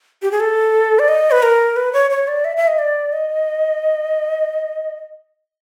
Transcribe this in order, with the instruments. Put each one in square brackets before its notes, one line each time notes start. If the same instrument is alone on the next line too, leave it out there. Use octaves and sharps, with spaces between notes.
[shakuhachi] G4
G#4
A4
D5
D#5
B4
A#4
B4
C#5
C#5
D5
E5
E5
D#5
D5
D#5